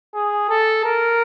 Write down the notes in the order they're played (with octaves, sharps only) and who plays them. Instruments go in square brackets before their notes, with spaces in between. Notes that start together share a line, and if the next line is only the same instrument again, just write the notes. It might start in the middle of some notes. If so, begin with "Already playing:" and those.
[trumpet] G#4
A4
A#4